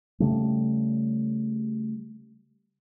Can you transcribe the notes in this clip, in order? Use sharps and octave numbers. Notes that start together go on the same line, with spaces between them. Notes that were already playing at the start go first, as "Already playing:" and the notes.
C#3 G3 A3